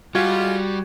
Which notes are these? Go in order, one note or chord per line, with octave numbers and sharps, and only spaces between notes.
G3 G#3 F4 F#4 G#6